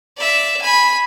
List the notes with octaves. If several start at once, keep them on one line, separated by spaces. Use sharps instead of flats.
D5 E5
G#5 B5